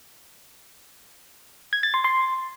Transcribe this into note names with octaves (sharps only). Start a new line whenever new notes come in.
G#6
A6
C6
C6